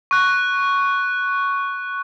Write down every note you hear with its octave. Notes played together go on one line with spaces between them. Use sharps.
C#6 F#6